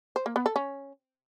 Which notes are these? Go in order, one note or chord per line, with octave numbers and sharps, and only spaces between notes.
C5
A#3
B3
A4
C#4